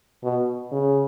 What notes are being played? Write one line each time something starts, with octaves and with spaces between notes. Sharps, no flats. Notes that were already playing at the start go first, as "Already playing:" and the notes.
B2
C#3